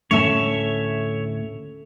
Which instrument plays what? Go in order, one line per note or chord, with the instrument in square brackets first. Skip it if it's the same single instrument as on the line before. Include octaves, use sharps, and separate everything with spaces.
[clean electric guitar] D2 A2 A5 [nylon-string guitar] A3 C#4 [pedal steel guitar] C#5 E5